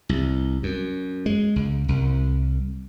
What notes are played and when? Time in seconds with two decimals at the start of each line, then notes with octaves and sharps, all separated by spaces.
0.09 C2
0.63 F#2
1.26 G#3
1.56 C#2
1.88 C2